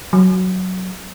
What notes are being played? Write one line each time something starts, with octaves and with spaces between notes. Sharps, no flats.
F#3